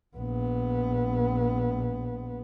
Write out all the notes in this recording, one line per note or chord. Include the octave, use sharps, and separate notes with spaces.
A#1 B3